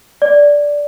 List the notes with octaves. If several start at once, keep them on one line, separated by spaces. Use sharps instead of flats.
D5